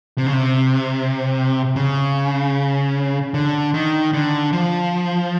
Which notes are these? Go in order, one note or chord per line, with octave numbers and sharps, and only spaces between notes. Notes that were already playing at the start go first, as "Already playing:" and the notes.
C3
C#3
C3
C#3
D3
D#3
D3
F3